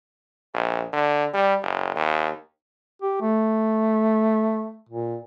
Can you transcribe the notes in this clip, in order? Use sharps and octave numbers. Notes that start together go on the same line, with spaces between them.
A#1
D3
G3
F#1
D#2
G4
A3
A#2